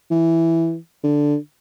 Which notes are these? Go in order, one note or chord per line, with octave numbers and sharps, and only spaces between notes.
E3
D3